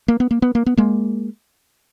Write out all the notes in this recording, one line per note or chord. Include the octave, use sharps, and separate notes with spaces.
A#3
B3
A#3
B3
A#3
B3
G#3 A#3